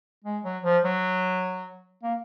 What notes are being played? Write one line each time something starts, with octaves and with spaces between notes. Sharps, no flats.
G#3
F#3
F3
F#3
A#3